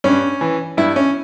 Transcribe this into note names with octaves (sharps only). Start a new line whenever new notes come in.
G2 C#4
E3
G2 E4
C#4